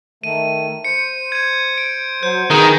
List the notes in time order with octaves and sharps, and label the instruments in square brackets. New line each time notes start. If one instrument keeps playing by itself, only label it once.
[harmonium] D#3 A3 [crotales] D#7
[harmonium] C5 [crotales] C#7
[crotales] G#6 D#7
D7
[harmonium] F#3 C5 [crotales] G6
[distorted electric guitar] D#3 [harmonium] B3 G#4 [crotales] G6